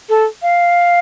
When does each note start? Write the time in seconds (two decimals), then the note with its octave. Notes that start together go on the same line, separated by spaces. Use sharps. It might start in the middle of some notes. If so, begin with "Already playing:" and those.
0.09 A4
0.42 F5